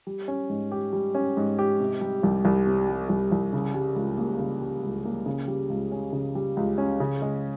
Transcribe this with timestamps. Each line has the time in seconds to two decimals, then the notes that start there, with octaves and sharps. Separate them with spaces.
0.07 G3
0.28 C#4
0.50 G#2
0.72 G4
0.93 G3
1.15 C#4
1.37 G#2
1.59 G4
1.80 C3
2.01 G3
2.23 C2
2.45 C2
2.67 C3
2.89 G3
3.09 C2
3.32 C2
3.53 C#3
3.74 G3
3.96 C#2
4.18 A#3
4.39 C#3
4.61 G3
4.83 C#2
5.05 A#3
5.26 C#3
5.48 G3
5.70 C#2
5.92 C#4
6.12 C#3
6.35 G3
6.57 C#2
6.78 C#4
7.00 C#3
7.22 G#3